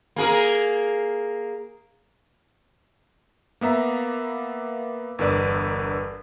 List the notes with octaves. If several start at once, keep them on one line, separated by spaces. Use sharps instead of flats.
A#3 G#4 A#4
A#3 B3 E5 A#5
G1 E2 G2 A#4 B4 D5